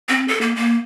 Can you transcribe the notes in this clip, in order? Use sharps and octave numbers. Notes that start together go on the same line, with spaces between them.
C4
A4
A#3
A#3